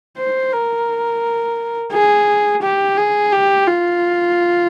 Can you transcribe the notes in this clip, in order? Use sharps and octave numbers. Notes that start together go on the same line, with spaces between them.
C5
A#4
G#4
G4
G#4
G4
F4